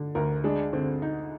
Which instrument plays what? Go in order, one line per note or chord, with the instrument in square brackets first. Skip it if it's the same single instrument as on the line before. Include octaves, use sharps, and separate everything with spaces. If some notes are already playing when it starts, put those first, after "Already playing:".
Already playing: [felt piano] D3
[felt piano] D2 [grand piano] A#4
[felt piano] G#3 [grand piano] D4
[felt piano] D3 [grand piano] C4
[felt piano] D#4